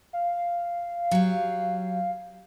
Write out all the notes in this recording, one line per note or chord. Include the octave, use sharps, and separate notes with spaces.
F5
F#3 G4